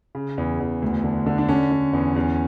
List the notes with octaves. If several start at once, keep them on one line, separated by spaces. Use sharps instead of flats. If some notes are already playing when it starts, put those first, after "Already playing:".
C#3
E2
E2
D2
D3
D3
D4
D3 C#4
D3
E2
E2